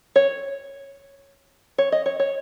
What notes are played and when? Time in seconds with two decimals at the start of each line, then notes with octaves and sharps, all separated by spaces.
0.16 C#5
1.78 C#5
1.92 D#5
2.06 C#5
2.20 C#5